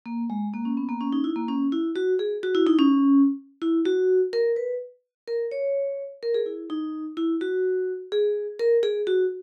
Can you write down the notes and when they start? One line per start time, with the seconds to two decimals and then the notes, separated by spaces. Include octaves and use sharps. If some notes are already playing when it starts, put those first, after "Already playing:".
0.06 A#3
0.30 G#3
0.54 A#3
0.65 C#4
0.77 B3
0.89 A#3
1.01 C#4
1.13 D#4
1.24 E4
1.36 A#3
1.48 C#4
1.72 E4
1.96 F#4
2.19 G#4
2.43 F#4
2.55 E4
2.67 D#4
2.79 C#4
3.62 E4
3.85 F#4
4.33 A#4
4.56 B4
5.28 A#4
5.51 C#5
6.23 A#4
6.34 G#4
6.46 E4
6.70 D#4
7.17 E4
7.41 F#4
8.12 G#4
8.60 A#4
8.83 G#4
9.07 F#4